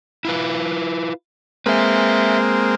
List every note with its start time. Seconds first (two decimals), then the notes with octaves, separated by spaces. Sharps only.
0.25 E4 F4 B4
1.66 G#3 A#3 C4 B4 E5